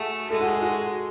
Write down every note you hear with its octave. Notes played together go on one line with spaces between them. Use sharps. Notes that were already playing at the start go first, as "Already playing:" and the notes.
Already playing: A3 F#4 G#4
G#3 A4
F#4
G#4
F#4